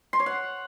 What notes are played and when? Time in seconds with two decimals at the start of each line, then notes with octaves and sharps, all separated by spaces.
0.13 C6
0.20 C#5
0.26 F#5